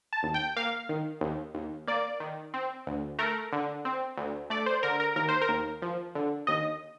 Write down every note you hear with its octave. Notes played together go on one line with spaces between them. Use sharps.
A5
D#2
G5
A#3 F5
D#3
D#2
D#2
A#3 D5
D#3
C4
D2
A3 A#4
D3
C4
D2
A3 D5
C5
D3 A#4
A#4
D#2 A#4
C5
A#4
D#2
F3
D3
D#2 D#5